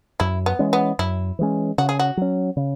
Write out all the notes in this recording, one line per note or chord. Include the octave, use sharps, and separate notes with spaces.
F#2 E4
B3
E3 G#3 C#4
B3
F#2 E4
E3 G#3 C#4
C#3 F#4
G#4
F#4
F#3 C#4
C#3